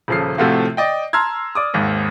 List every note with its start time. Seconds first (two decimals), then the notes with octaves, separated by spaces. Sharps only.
0.08 D#1 C#3 F3 A4 C7
0.38 A2 C3 F3 A3 F4 F#4
0.77 D5 D#5 G5
1.13 A5 A#5 C6 E6 F6 G#6
1.55 D5 D6 D#6
1.74 G#1 D#2 G#2